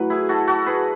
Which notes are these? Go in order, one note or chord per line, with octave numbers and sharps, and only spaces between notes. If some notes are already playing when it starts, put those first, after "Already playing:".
Already playing: A2 F#3 B4
E4 G#4
F#4 A4
F#4 A4
G#4 B4